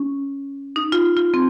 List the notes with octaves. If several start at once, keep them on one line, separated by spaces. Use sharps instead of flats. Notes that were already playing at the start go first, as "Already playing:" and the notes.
Already playing: C#4
D#4
F4
F4
C4